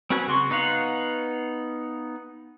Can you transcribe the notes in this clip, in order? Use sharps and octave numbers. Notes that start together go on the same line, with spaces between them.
C4 C#4 F#4 B4 G#5
C#3 F#4 C6 C#6
B3 D#4 B4 F5 F#5